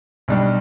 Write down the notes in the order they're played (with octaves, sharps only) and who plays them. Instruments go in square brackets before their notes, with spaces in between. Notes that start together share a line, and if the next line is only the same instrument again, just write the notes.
[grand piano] B1 B2 G3 D4